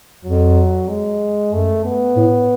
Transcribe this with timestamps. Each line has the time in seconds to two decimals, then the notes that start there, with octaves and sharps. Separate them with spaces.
0.25 F2 F#3
0.88 G#3
1.52 F#2 A3
1.84 B3
2.16 A2